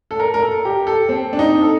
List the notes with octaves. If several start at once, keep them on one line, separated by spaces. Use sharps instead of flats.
A4
A#4
A#4
A4
G4
A4
C4
D4
D#4
A4